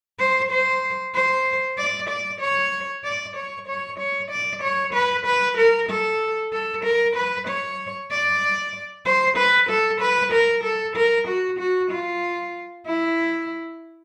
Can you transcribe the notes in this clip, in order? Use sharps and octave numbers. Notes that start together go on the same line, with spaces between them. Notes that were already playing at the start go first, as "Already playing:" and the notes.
C5
C5
C5
D5
D5
C#5
D5
C#5
C#5
C#5
D5
C#5
B4
B4
A#4
A4
A4
A#4
B4
C#5
D5
C5
B4
A4
B4
A#4
A4
A#4
F#4
F#4
F4
E4